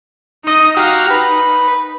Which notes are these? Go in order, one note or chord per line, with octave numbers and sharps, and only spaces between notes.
D#4 D#5
F#4 G4 F5 A#5
D#4 B4